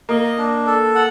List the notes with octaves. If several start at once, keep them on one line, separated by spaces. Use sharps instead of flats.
A#3 D#5
D4
A4
F#5